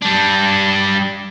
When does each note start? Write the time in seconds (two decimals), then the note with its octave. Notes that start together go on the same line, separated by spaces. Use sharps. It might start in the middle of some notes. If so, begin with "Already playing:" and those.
0.02 G3 D4